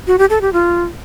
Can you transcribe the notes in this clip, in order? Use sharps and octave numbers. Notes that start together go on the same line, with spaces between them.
F#4
G4
A4
G4
F4